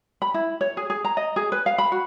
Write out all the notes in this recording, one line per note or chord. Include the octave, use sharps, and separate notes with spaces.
B5
E4
C#5
G#4
G#4
A#5
D#5
G#4
B4
F5
B5
F#4